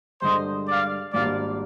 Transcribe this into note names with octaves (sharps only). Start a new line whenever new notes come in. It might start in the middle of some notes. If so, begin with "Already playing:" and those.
G2 D3 G#3 D4 C5 D#5
D5 F5
G#1 G#2 G3 A#3 D4 D5 F5